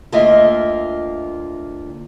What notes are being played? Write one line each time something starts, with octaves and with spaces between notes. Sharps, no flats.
D2 A#3 F4 D#5 E5